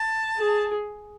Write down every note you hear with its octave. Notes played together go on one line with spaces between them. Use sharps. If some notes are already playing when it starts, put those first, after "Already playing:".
Already playing: A5
G#4